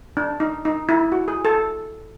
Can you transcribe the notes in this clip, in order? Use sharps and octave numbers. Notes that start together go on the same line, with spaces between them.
D4
D#4
D#4
E4
F#4
G#4
A4